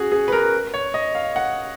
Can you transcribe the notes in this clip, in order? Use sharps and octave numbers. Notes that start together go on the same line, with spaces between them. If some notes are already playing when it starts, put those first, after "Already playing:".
Already playing: C#4 F#4 G#4
G#4
B4
A#4
C#5
D#5
F5
F#5